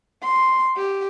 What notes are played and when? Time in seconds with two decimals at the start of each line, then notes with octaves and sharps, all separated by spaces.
0.23 C6
0.77 G4